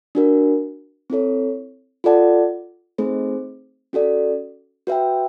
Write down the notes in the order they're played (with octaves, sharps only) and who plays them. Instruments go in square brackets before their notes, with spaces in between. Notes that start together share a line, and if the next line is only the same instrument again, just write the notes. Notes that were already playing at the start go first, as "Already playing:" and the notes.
[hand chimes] D4 F#4 A#4
C4 E4 A4 C#5
F4 A4 D5 F#5 A5
A3 C4 D#4 G#4 C5
C#4 F#4 A4 D5
F#4 B4 E5 G5